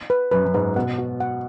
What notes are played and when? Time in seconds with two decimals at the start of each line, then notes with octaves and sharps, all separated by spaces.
0.10 B4
0.32 F#2 B4
0.45 F#2
0.54 G#2 B4
0.76 B2 F#5
0.99 F#4
1.20 F#5